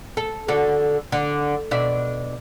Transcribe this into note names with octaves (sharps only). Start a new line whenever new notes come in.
A4
D3 F#4 A4
D3
B2 D4 E5